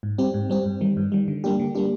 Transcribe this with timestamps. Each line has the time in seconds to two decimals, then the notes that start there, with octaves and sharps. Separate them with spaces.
0.03 G#2
0.18 G3 C4 G4
0.34 G#2
0.50 G3 C4 G4
0.66 G2
0.81 D#3 G3
0.97 G2
1.12 D#3 G3
1.28 D3
1.44 G3 A#3 D4 G4
1.59 D3
1.75 G3 A#3 D4 G4